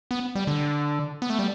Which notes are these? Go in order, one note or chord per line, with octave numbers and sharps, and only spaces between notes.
B3
G3
D3
B3
A3
G3